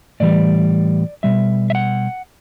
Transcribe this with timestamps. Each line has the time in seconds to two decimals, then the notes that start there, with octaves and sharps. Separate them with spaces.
0.20 A2 E3 G3 D5
1.23 B2 G3 E5
1.70 E5
1.75 F#5